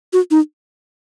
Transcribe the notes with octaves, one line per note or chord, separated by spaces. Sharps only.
F#4
D#4